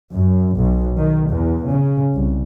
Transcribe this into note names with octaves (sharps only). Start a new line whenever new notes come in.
F#2
B1
D#3
E2
C#3
C2